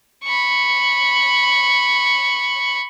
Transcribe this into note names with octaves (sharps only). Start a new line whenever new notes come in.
B5 C#6